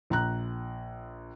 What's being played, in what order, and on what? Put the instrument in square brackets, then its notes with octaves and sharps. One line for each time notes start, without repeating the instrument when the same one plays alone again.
[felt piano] A#1 A#5 F#6